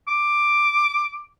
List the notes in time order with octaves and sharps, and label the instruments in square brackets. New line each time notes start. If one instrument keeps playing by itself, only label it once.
[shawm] D6